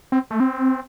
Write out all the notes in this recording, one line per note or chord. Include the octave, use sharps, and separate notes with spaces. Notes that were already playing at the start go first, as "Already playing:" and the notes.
C4
A3
C4